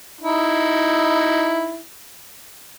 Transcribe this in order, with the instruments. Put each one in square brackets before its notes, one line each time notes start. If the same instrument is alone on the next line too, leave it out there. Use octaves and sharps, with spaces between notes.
[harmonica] D#4 E4